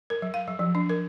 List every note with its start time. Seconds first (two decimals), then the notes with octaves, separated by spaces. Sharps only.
0.10 A#4
0.22 F#3
0.34 F5
0.47 F#3
0.59 F3
0.75 D4
0.90 A#4